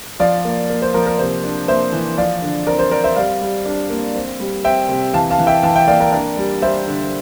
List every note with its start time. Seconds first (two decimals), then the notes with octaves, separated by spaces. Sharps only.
0.20 F3 D5 F5
0.45 A#3
0.70 A#3
0.82 C5
0.94 F3 A#4
1.06 A#4
1.19 C3 C5
1.44 D4
1.68 A#3 C5 E5
1.93 E3
2.18 F3 D5 F5
2.42 D3
2.67 C4 A#4 D5
2.79 C5
2.91 C4 A#4 D5
3.04 C5 E5
3.16 G3 D5 F5
3.41 G3
3.66 D4
3.90 A#3
4.15 C4
4.40 G3
4.64 C4 E5 G5
4.89 C3
5.14 E3 F5 A5
5.30 F5 A5
5.38 E3
5.47 E5 G5
5.63 E3 F5 A5
5.76 E5 G5
5.88 A#3 D5 F5
6.00 A#4 D5
6.12 D4 A#4 D5
6.37 G3
6.62 G3 C5 E5
6.87 D3